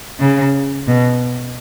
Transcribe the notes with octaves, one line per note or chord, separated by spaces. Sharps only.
C#3
B2